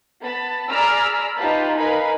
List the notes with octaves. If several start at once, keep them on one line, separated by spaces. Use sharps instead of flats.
B3 A5 B5
G#4 D5 A#5 B5 E6 F6
D#4 F4 G4 B4 A5 B5
D#4 A#4 B4 F5 G#5 B5